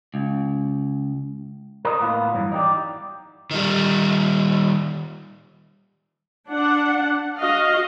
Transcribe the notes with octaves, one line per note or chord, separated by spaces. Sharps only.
C#2
A#4 D#5
A2 A#3 B3 F4
G2 E3 F#3
D#4 G4 D5
D#3 G3
D4 F#5
F#4 D#5 F5